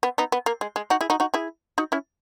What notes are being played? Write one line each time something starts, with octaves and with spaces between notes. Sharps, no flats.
B3
B3 D#4
B3
A#3
G#3
G#3
D#4 F#4
E4 G#4
D#4 F#4
D#4 F#4
E4 G#4
D#4 F#4
C#4 E4